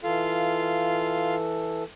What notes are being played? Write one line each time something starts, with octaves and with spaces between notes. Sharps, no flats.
E3 F4 A4 F5